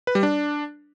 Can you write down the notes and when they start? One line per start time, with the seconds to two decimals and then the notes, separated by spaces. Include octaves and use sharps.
0.07 B4
0.15 G3
0.23 D4